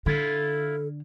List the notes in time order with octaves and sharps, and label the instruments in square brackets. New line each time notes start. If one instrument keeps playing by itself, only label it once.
[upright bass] D3 [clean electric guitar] E4 F4 [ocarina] A4